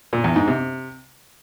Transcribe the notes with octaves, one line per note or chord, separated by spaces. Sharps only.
A#2
E2
G#2
C3